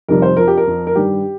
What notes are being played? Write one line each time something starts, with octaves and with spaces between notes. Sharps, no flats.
F2 C3 D#3 G3 A#4
C5
F2 F3 A#4
G4
A#4
F2 F3
A#4
G2 D#3 G3 G4